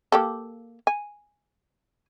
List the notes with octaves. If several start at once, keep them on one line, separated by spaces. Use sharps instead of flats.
A#3 G4 A4
G#5